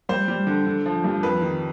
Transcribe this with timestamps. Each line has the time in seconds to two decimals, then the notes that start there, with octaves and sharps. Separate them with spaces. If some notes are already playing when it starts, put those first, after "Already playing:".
0.09 G3 C5
0.28 G3
0.47 D3
0.66 D3
0.86 F3
1.04 G2
1.23 F2 B4
1.42 D#3